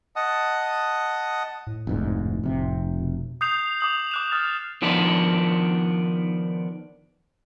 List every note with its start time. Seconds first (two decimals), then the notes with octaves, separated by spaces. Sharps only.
0.16 D#5 F#5 A5 D#6
1.67 A2
1.87 F1 D2 G#2
2.43 F1 C3
2.99 B2
3.41 D#6 G6 C7 F7
3.81 D6 D#6 F#7
4.11 D6 F#6 E7
4.32 D#6 F6 A6
4.82 D#3 F3 B3 D4